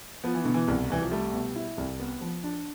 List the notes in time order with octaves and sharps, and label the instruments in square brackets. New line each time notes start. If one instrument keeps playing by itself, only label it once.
[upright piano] F3 [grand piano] B3
[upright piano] E3
[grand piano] B2 [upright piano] D3
[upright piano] E3
[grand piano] C2
[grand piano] C2 [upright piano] E3
[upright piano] F3
[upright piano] G3 [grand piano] A3
[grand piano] B2
E4
C2
B3
F3
D4